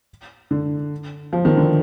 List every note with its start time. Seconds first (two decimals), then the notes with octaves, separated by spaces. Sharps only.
0.51 D3
1.33 F3
1.45 D#3
1.57 D3